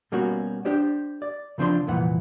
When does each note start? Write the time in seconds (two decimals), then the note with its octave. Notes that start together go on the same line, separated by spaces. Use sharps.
0.12 B2 G3 A#3 C#4 F#4
0.65 D4 G4 C5 D5
1.22 D5
1.58 C#3 F3 C4 D4 C6
1.87 C2 F2 A#2 E3 F#5